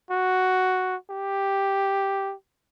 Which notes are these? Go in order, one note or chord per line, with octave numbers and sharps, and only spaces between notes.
F#4
G4